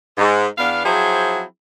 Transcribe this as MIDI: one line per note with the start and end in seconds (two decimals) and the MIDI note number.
0.18 0.46 44
0.57 0.83 40
0.57 0.83 59
0.57 0.83 62
0.57 0.83 77
0.84 1.42 53
0.84 1.42 54
0.84 1.42 60
0.84 1.42 64
0.84 1.42 68
0.84 1.42 72